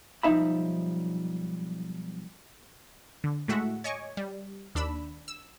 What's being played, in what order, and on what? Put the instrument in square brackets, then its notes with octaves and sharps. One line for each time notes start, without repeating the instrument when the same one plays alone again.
[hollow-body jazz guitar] B1 F3 G3 D#4 E5 B5
[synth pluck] D3
A2 G#3 A3 F#4 E5 F#5
C#5 D#5 G#5 C#6 D6
G3
D#2 D4 B5 E6
E6